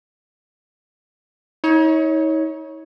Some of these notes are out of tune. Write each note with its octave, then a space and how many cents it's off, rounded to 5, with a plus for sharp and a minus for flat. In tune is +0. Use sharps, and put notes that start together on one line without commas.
D#4 +40 C#5 +0